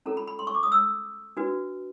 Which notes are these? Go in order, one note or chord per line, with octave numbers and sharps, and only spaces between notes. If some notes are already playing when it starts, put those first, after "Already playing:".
C#4 F4 A4 A#5
B5
B5
C6
C#6
D6
D#6
E6
D4 F#4 B4